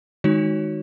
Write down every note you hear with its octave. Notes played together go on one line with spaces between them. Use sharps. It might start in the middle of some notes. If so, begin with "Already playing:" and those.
D#3 G#3 D#4 F#4 C#5